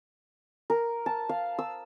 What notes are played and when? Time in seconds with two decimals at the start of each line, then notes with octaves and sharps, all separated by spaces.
0.70 A#4
1.06 A5
1.29 F5
1.58 E6